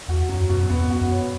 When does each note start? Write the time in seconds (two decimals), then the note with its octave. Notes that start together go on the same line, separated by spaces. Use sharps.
0.08 E2 F#4
0.29 F#2 F#3
0.49 F#2 B2
0.70 E2 B3
0.85 F#2
0.90 F#4
1.01 F#2
1.11 C#5